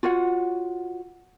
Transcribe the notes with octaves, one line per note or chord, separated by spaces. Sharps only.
F4 F#4 C#5 F#5